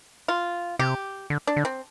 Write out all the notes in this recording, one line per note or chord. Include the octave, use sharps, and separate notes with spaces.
F4
C3 G4
D3
D4
D3
C4